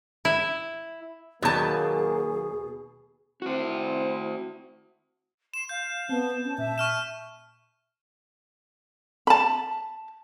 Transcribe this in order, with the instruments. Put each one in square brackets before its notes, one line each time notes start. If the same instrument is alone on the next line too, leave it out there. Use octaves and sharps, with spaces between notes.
[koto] E4
[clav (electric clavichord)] D#2 [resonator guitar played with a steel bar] B2 A5 [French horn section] F#3 A#3 [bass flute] G#4
[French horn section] C4 E4 [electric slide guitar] F#4 C5
[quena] C6 [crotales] E7
[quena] F5 [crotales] G6
[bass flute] B3 [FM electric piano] C4 [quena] A5
[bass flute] C#4
[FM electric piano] A#2 [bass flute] E5
[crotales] C#6 F6 E7
[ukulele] A5 B5